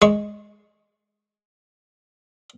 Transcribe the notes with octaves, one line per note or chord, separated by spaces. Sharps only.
G#3 C#6